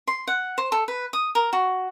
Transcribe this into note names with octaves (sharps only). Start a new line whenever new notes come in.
C6
F#5
C5
A4
B4
D#6
A#4
F#4